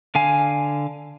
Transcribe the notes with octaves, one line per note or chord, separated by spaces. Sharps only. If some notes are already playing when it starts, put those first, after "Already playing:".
D3 F5 G#5